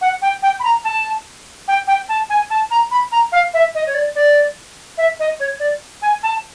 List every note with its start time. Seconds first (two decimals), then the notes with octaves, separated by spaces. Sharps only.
0.01 F#5
0.22 G5
0.42 G5
0.59 B5
0.64 A#5
0.84 A5
1.68 G5
1.87 G5
2.08 A5
2.29 G#5
2.50 A5
2.70 A#5
2.91 B5
3.11 A#5
3.32 F5
3.54 E5
3.74 D#5
3.86 C#5
3.94 D5
4.15 D5
4.97 E5
5.19 D#5
5.39 C#5
5.59 D5
6.02 G#5
6.23 A5